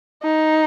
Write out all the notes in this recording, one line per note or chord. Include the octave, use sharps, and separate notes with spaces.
D#4